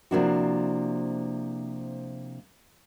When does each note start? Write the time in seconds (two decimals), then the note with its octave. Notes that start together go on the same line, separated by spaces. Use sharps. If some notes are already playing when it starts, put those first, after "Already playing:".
0.11 C3 F3 A#3 D4 E4 F#4